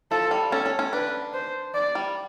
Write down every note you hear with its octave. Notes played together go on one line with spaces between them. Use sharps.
F3 A4
G3
C#4 A4
C#4
C#4
D4 B4
C5
D5
G3